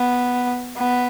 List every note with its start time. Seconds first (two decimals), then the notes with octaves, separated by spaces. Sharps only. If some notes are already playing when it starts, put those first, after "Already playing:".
Already playing: B3
0.77 B3